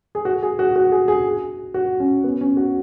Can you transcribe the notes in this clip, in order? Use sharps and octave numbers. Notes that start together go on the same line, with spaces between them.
G#4
F#4
G#4
F#4
F#4
G#4
G#4
F#4
C#4
B3
C#4
F#4